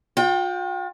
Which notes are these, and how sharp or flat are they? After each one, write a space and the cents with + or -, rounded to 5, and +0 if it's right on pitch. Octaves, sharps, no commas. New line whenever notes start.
F4 +45 G5 +0